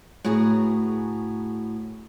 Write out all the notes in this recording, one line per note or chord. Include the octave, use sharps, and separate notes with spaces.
A2 B3 F#4 G#4 A#5